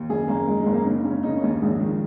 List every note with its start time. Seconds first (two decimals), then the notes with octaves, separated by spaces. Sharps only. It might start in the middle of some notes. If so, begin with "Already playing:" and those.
Already playing: D#2
0.09 F#1 G#4
0.28 F#1 A#3
0.47 F#1 G#3
0.61 G#3
0.66 F#1
0.73 A#3
0.85 C#3 A#3
1.04 C#3 C#4
1.23 C#3 D#4
1.37 C#4
1.43 D#2
1.62 A#1 G#3
1.81 D#3